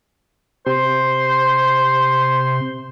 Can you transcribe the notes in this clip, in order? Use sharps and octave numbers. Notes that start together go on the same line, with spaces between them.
C3 C5 C6